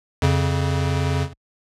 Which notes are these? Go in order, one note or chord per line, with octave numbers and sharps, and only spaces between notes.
F2 C#3